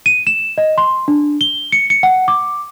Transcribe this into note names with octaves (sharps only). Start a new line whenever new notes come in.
D#7
E7
D#5
C6
D4
G7
C#7
C#7
F#5
D6